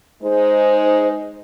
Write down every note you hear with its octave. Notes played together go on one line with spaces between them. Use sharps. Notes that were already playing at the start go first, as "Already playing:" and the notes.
G#3 D#4 C5